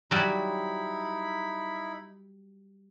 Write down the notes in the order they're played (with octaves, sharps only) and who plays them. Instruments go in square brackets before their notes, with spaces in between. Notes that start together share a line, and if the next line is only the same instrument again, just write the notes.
[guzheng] F#3 G3 [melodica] D#4 E4 B5